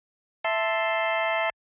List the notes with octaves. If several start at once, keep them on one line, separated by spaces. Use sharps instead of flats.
E5 A5 C6